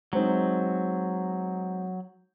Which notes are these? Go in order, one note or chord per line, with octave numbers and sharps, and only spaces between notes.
F#3 G#3 C4 D#4